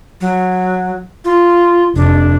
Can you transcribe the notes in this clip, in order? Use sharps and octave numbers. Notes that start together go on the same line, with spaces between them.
F#3
F4
F1 D4